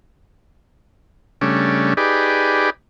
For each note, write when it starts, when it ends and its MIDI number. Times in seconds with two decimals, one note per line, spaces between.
1.41 1.94 49
1.41 1.94 55
1.41 1.94 57
1.41 1.94 61
1.41 1.94 62
1.97 2.70 63
1.97 2.70 67
1.97 2.70 68
1.97 2.70 71
1.97 2.70 74